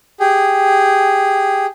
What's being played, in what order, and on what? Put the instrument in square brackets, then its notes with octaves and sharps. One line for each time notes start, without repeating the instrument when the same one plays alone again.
[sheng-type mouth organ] G4 G#4